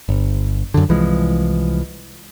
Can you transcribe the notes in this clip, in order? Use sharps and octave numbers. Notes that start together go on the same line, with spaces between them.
G1
F#2 D3
C2 E3 F3 G#3